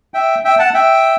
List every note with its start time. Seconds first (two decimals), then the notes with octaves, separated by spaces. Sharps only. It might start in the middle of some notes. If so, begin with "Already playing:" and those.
0.14 E5 G5
0.45 E5 G5
0.59 F#5 A5
0.74 E5 G5